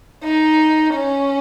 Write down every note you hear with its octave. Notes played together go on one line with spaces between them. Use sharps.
D#4
C#4